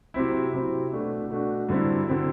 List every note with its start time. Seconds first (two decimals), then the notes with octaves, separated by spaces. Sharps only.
0.14 C3 F#3 C4 E4
0.53 C3 F#3 C4 E4
0.92 B2 A3 D4 F#4
1.30 B2 A3 D4 F#4
1.69 G2 D3 F#3 C4 E4
2.07 D3 F#3 C4 E4